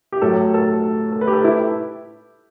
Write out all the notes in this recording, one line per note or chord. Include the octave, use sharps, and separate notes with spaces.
G4
A2 F#3 A4
A4
A4
B4
G4
A4
E4